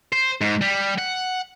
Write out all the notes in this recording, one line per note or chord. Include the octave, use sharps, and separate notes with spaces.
C5
G#2
G3
F#5